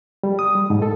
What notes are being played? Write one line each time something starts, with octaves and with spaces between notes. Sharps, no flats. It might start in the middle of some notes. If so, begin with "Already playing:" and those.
G3
D#6
G3
G#2
A4